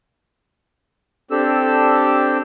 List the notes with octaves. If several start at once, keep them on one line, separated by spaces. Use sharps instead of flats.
C4 D4 G4 A4 E6